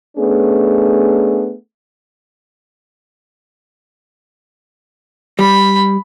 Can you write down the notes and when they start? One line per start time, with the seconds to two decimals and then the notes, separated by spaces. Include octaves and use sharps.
0.17 A3 B3 C#4 D4 G#4
5.39 G3 B5